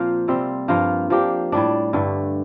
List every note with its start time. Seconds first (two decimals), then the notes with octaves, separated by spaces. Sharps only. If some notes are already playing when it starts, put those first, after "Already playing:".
Already playing: A#2 F3 A#3 C4 F4 C5
0.28 C3 G3 C4
0.68 G2 F3 A#3 F4
1.10 F3 A#3 D4 G4
1.52 A2 G3 D4
1.93 G2 D3 A3